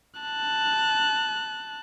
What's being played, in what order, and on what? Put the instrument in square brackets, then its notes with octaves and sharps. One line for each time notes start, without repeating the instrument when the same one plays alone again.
[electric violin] A5 F#6